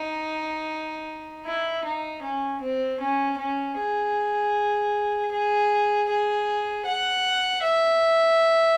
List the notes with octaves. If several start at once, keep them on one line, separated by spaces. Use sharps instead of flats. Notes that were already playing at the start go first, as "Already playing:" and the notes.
Already playing: D#4
E4
D#4
C#4
C4
C#4
C#4
G#4
G#4
G#4
F#5
E5